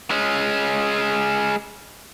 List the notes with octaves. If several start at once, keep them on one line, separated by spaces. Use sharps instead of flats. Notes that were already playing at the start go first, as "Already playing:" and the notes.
G#3 C#4